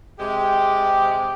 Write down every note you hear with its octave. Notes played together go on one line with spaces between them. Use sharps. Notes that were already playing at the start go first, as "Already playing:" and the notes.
C3 G#3 G4